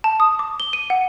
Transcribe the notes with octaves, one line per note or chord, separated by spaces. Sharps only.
A5
D#6
D6
G7
D#7
F#5